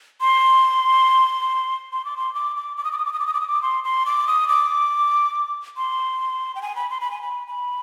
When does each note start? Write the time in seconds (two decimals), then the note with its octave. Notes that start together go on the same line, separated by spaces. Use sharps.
0.21 C6
1.93 C6
2.05 D6
2.17 C6
2.35 D6
2.56 D6
2.77 D6
2.85 D#6
2.92 D6
2.98 D#6
3.05 D6
3.13 D#6
3.20 D6
3.27 D#6
3.34 D6
3.41 D#6
3.48 D6
3.62 C6
3.84 C6
4.06 D6
4.28 D#6
4.49 D6
5.77 C6
6.55 G5
6.62 G#5
6.76 B5
6.90 C6
7.00 B5
7.11 G#5
7.22 B5
7.47 B5